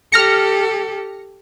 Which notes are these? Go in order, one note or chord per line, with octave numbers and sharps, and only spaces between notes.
G4 A4 F6 A#6 C#7